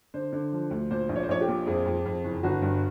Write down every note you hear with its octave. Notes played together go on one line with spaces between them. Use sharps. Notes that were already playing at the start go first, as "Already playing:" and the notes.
D3 C5
D3
F3
D2
A#2 C5
A#1
C#5
C5
A#1 C#5
G4
A#2
F2 G#4
F2
F2
F#1
G1 F#4
G2